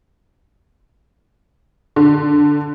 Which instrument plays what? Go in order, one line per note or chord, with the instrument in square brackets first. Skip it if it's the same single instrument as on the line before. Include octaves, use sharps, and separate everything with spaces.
[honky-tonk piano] D3